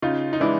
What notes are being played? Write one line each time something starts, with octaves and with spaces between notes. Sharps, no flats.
C#3 D#4 F4
D#4
E3 G#3 D4 E4